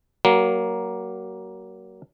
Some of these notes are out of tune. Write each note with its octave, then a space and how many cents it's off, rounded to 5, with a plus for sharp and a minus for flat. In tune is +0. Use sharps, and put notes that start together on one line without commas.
F#3 +25 A#3 +10